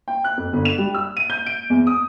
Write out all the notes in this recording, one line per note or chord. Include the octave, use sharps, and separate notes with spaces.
G5
F#6
F2
G1
E7
G3
E6
D#7
G6
D7
E2
D#6